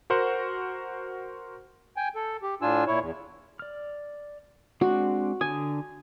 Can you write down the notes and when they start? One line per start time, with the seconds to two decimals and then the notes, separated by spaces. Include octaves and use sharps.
0.10 F#4 A#4 C5 F#5
1.97 G5 G#5
2.16 A4
2.42 G4
2.62 A2 D4 F4 G#5 E6
2.87 A#2 E4 C#5
3.01 E2
3.59 D5 F6
4.81 G#3 C4 D4 F#4
5.41 D3 D4 G#5 D#6